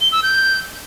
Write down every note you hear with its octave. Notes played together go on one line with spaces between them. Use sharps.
G7
E6
G6